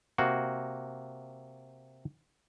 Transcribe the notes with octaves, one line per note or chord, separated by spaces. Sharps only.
C3 A#3 F#4